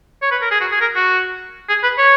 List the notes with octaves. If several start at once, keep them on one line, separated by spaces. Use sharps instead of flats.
C#5
B4
A#4
G#4
F#4
G#4
A#4
F#4
G#4
B4
C#5